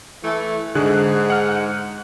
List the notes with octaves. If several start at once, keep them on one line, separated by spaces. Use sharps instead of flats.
E3 A3
G#2 D3 G#4 F#6
F#5 F6